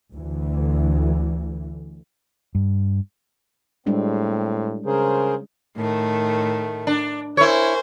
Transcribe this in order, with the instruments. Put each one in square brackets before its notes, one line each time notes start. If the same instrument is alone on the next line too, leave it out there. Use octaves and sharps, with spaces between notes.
[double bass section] D2 E3
[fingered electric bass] G2
[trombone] A2 [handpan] G3 G#3 D4 [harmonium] C4
[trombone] C#3 [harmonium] G#4 A#4 C5
[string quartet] A2 D#3 A3
[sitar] D4
[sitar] E4 C#5 [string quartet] A#4 C5 G#5